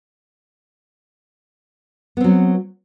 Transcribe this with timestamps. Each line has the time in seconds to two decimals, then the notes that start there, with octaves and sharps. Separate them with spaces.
2.17 B3
2.21 C4
2.24 F#3